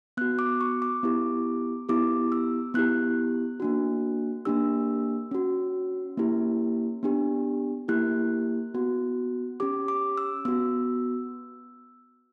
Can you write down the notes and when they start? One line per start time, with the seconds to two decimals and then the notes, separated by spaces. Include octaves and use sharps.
0.17 B3 F#4 F#6
0.39 D6
0.61 C#6
0.82 D6
1.03 B3 E4 G4
1.89 B3 E4 G4 D6
2.32 E6
2.74 B3 E4 G4 F#6
3.60 A#3 D4 F#4
4.45 A#3 D4 G4 E6
5.31 C#4 F#4
6.17 A#3 C#4 E4 G4
7.03 B3 D4 G4
7.88 A#3 E4 G4 F#6
8.74 B3 F#4
9.60 C#4 G4 D6
9.88 D6
10.17 E6
10.45 B3 F#4 E6